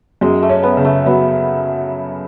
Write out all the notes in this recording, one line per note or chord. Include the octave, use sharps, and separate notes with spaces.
F#2 G#3
A3
C#4
B3
C#3
A3
F#3 B3